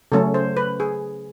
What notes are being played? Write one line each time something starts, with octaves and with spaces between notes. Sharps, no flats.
C#3 F#3 A3 C#4 A4
C5
B4
G#4